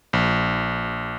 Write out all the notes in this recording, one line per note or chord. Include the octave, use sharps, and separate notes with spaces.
A#1